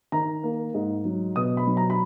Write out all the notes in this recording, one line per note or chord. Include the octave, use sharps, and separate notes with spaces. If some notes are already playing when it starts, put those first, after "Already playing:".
D#3 A#5
A#3
G#2
F#3
B2 D#6
B5
F#3
A#5
B5